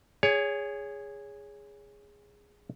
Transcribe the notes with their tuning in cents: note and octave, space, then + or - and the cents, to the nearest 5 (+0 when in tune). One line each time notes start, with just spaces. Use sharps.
G#4 -10 C#5 +20